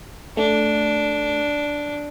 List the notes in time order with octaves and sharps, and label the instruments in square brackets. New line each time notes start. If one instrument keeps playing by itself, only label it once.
[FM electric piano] A3 [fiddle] D4